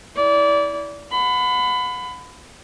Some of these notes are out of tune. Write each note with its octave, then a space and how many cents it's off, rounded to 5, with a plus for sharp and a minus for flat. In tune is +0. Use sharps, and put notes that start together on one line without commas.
E4 -15 D5 -25
F#5 -40 B5 +25